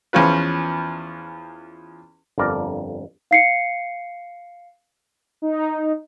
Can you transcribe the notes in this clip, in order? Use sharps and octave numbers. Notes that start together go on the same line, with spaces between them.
E2 F3 C#4 F4 B4
G1 F2 A#4 D5 A#5
F5 C7 C#7
D#4